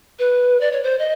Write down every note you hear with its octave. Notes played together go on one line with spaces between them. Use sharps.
B4
D5
C#5
C5
D#5